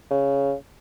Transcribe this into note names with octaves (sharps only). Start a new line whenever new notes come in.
C#3